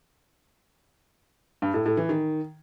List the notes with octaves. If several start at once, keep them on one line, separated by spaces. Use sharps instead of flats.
G2
A2
A2
E3
D#3